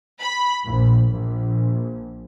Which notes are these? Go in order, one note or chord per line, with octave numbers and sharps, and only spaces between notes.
B5
A#1
A#1